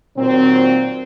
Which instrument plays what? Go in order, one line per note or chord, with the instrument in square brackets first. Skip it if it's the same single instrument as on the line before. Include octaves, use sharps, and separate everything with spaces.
[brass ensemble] A#2 D#3 F#3 C4